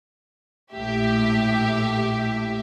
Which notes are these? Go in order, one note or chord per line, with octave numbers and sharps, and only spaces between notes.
A#1 A2 G4 E5